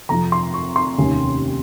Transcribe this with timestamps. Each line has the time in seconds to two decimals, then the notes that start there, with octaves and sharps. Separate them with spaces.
0.09 F2 C3 F3 A#5
0.32 C6
0.54 C#6
0.76 C6
0.98 F1 D#2 D#3 A#3 C#4